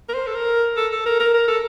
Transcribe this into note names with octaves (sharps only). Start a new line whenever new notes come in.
A#4
C5
A4
A#4
A4
A4
A#4
A#4
A#4
A4